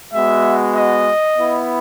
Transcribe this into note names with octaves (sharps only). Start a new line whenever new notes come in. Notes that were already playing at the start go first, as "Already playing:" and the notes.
G#3 B3 F#4 E5
D#5
B3 E4